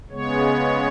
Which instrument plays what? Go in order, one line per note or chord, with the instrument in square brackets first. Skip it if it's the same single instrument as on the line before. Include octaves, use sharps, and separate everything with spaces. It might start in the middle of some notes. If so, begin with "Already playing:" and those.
[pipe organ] C#3 G#3 B3 C#5